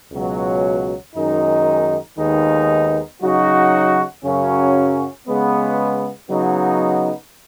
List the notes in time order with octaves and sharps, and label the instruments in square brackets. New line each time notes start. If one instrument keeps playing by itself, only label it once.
[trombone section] C#2 B2 F#3
F#2 D#3 G#3 D#4
D#2 D#3 G#3 B3 D#4
C#3 F#3 D#4 F#4
F#2 C#3 F#3 C#4
C#3 G#3 B3
C#3 F#3 B3 D#4